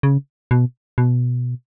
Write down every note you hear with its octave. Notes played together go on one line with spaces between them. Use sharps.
C#3
B2
B2